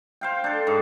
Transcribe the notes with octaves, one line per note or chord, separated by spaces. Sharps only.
C5 F5 G5
D4 A4
G#2